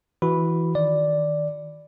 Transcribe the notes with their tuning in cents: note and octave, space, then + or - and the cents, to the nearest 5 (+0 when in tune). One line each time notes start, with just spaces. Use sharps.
E3 +0 F#4 +5 B5 +0
D#3 +0 D5 +0